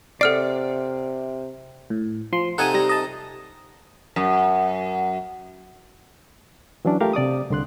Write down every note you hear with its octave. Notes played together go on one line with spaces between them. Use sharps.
C3 A4 D5 F#5 F6 C7
A2
F3 C6
C3 D#4 A4 F#5 G#5 D#6
G3 A#6
D#5 A5
F#2
E3 F#3 C#4 D4
A3 F4 G4 A#4 F5
C3 D5 D6 D#6
C2 D3 C6 F#6